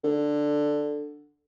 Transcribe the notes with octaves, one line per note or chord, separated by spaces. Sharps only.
D3